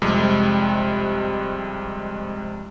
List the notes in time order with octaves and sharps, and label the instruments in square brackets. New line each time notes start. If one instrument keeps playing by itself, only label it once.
[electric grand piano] F2 C3 G3 G#3